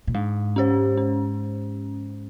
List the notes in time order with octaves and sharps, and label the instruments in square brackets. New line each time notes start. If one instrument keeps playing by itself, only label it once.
[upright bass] A#2
[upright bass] G#2 [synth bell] G#3
[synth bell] C#4 G4 C5
C#4